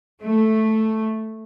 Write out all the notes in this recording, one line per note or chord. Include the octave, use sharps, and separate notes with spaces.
A3